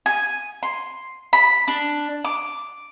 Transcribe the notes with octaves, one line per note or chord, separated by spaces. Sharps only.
G#5
C6
B5
D4
D6